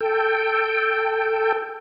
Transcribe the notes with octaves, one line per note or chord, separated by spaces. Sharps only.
A4 G5